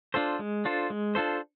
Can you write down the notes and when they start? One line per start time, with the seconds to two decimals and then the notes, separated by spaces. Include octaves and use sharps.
0.14 D4 F4 A4 C5
0.39 G#3
0.65 D4 F4 A4 C5
0.90 G#3
1.15 D4 F4 A4 C5